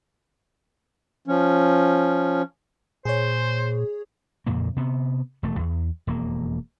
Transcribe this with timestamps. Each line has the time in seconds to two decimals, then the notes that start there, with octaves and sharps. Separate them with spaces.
1.28 F3 C#4
3.05 A#2 G#4 C5 C#5
4.46 F2 A#2 C#3 A#3
4.76 C3 B3
5.43 E1 A3
5.59 E2
6.07 E1 F2 A#3